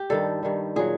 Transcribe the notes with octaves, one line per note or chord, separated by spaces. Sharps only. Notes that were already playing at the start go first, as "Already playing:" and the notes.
Already playing: G4
G2 D#3 G3 A4
G2 D#3 G3
A#2 F#3 G#4